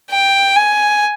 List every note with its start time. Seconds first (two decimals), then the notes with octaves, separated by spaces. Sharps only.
0.11 G5
0.56 G#5